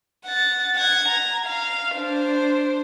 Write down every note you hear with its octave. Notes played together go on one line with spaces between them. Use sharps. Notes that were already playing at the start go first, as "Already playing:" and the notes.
F#5 A6
F#5 G#6
A#5
F5
D4 C5